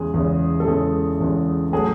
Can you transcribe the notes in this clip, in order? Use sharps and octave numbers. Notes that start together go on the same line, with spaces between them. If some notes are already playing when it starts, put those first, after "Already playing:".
Already playing: E2 C#3 G#3 G#4
E2 C#3 G#3
A4
E2 C#3 G#3 G#4
E2 C#3 G#3
A2 F#3 A3 G#4